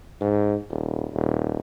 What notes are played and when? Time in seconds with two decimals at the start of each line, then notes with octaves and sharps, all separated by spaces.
0.21 G#2
0.70 D#1
1.14 D#1